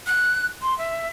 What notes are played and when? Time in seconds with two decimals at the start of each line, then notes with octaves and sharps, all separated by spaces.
0.07 F#6
0.62 C6
0.78 E5